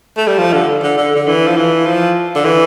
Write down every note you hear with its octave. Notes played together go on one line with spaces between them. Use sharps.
A3
G3
F3
D3
D3
D3
D3
E3
F3
E3
F3
D3
E3